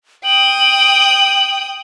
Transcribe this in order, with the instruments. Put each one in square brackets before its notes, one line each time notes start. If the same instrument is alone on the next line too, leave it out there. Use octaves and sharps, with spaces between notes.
[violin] G5 D#6 [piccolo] F#7